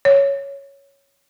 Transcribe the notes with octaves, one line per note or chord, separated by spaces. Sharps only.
C#5